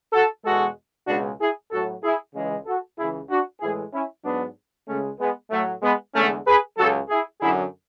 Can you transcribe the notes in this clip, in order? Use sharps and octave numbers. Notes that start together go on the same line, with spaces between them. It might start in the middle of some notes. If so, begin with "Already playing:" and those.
F#4 A4
E2 B2 G#3 F#4 A4
C#2 B2 G#3 D4 F#4
E4 G#4
A2 F#3 F#4 A4
E4 G#4
C#2 C#3 E3 G#3
F#4 A4
C#2 C#3 E3 E4 G#4
D4 F#4
A2 E3 G#3 E4 G#4
C#4 E4
G#2 F#3 B3 D4
C#2 C#3 G#3 A3 C#4
G#3 B3
A2 F#3 A3
G#3 B3
E2 D3 G#3 A3 C#4
G#4 B4
C#2 C#3 F#3 F#4 A4
E4 G#4
F#2 D3 F#3 E4 G#4